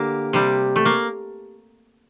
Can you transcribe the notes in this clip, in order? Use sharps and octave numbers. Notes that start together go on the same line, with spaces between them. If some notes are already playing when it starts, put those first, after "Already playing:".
Already playing: D3 A#3 G4
C3 G3
A3
A#3